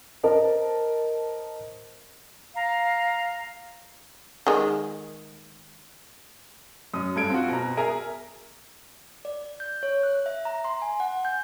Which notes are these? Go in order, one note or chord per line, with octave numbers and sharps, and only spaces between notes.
A#4 C5 D#5 A5
F5 A#5
D#3 G#3
F#2 D#6
G2 A4 G#6 D7
C4 F4 F#4
B2 A#5
G#4 A#4 E5 G#5 A#5
D5
G6
C#5
F#6
E5
A#5
C6
G#5
F#5
G6